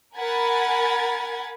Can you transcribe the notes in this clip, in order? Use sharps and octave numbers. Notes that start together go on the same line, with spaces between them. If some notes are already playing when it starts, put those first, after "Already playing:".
A#4 F#5 G#5 B5 G#6 A6